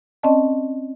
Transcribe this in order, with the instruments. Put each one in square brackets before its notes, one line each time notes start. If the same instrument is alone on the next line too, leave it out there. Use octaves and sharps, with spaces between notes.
[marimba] C4 C#4 D5 D#5 A5